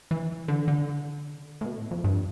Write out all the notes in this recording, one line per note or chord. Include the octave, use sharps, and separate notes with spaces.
E3
D3
D3
A2
B2
A2
F2
G2